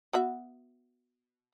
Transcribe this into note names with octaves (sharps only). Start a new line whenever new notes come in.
B3 F#4 E5